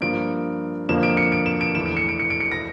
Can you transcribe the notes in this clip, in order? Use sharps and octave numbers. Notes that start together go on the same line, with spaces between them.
G2 F3 A#3 D7
F2 D3 F3 A#3 E7
D7
C#7
D7
E7
D7
E2 E3 A3 E7
D7
C#7
D7
C#7
D7
C#7
A#6